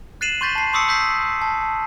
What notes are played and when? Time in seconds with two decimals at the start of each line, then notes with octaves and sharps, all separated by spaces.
0.21 F#6 A6 C7 D#7 E7 F#7
0.41 C6 C#6 G6 A6 B6 C7
0.55 A5 C7
0.73 C6 C#6 D#6 E6 B6 C#7
0.87 C6 D#6 G6 B6 C7
1.42 A5